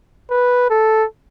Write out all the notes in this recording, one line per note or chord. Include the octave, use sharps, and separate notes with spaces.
B4
A4